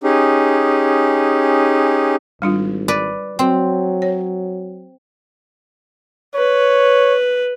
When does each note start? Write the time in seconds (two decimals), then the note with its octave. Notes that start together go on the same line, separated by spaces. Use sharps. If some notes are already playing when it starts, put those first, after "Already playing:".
0.04 C#4 D#4 G4 G#4
2.42 G#1 G3 D4 F4
2.88 B4 D5
3.39 F#3 C4
4.02 C#5
6.35 B4 C#5